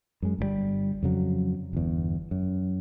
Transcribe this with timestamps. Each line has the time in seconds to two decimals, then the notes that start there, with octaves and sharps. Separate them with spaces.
0.22 F#2 G#3
0.39 G1 A#2 G3
1.03 F2 C#3 F#3
1.73 G1 E2
2.31 F#2